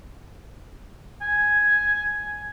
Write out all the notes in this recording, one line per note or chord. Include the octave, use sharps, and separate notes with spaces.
G#5